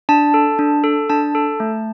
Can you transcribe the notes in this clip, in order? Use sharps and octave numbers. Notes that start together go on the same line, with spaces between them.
D4 A5
A4
D4
A4
D4 A5
A4
A3